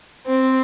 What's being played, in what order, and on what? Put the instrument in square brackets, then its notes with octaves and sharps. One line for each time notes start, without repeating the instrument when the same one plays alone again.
[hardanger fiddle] C4